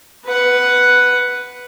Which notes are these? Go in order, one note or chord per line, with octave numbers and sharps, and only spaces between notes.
B4 F#5